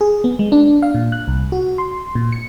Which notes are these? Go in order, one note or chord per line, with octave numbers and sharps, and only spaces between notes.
G#4
B3
G#3
D4
F5
A#2
F#6
C2
F#4
C6
A#2
C#7